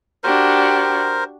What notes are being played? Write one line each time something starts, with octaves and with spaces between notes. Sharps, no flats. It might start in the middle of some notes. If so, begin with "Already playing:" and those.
D4 F#4 G4 A#4 C5